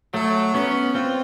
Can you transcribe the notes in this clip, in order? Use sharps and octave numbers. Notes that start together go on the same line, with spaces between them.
F#3 A3
B3 C#4
C4 F4